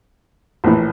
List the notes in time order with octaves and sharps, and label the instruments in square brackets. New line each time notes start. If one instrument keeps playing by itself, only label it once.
[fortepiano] A#1 A2 E3